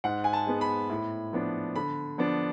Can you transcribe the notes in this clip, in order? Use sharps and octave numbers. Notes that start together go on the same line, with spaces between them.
G#2 F#5
G#5
A5
G#3 B3
B5
A2
F3 B3 D4
D3 B5
F3 B3 D4